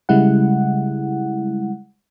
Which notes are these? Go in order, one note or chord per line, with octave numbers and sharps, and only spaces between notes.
C#3 G3 G#3 E4 F#5